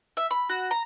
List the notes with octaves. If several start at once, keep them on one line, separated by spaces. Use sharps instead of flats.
E5
B5
F#4
A#5